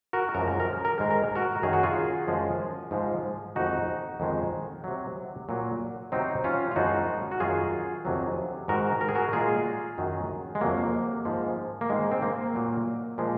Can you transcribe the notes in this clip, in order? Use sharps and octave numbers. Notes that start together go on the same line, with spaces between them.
F#4 A#4
F#2 F3 G#3 A#4
A#4
A#4
G#2 D#3 G#3
A#4
F#4 A#4
F#2 D#3 F#3 G#4
F#4
F4 G#4
F#2 F3 G#3
G#2 F3 G#3
F2 D#3 G#3 D#4 F#4
F2 D#3 G#3
C3 F#3
A#2 F#3
C3 F#3 C4 D#4
C#4 F4
F4
F#2 F3 G#3 D#4 F#4
F#4
F#2 D#3 F#3 F4 G#4
F2 C3 D#3 F#3
G#2 D#3 G#3 F#4 A#4
A#4
G#4
F#4 A#4
A#2 G#3 F4 G#4
F#2 D#3 F#3
G#3
F2 C3 F#3 A#3
G#2 F3 G#3
A#3
G#2 D#3 G#3
C4
A#3
A#2 F#3
A#2 F3 G#3